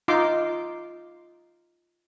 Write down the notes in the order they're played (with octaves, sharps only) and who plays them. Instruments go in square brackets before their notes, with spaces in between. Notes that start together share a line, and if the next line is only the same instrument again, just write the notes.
[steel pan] D#4 F4 C6 D6